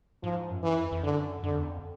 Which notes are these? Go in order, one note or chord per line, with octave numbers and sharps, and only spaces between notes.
G#2 F3
F#2
E3
F2
F2
F#2 D3
F#2 D3
F2
E2
F2